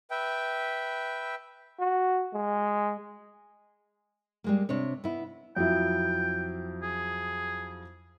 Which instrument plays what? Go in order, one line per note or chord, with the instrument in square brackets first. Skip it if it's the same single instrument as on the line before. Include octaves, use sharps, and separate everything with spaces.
[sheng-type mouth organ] B4 E5 G5
[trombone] F#4
G#3
[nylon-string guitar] G3 G#3 A#3
C3 D4 C#5
B3 E4
[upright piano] F2 F#3 E4 [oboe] G5
[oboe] G#4